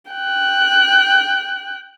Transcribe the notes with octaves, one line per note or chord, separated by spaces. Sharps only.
G5 F#6